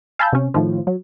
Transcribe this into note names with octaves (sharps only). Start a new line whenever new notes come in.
F5 G#5 A5 B5 E6 G6
C3 C#4
A2 D#3 F3
F#3